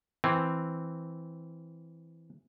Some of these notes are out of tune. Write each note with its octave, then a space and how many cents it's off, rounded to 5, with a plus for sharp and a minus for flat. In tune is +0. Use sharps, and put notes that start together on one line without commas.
E3 +0 C4 +0